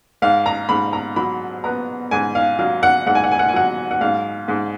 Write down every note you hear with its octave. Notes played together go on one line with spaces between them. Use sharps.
G#2 F5
A#5
G#2 B5
A#5
F#3 B5
B3 A#5
G#2 G#5
F5
F#3 F5
F#5
G#2 F#5
G#5
F#5
G#5
F#5
G#5
F#3 F#5
F#5
G#2 F5
G#2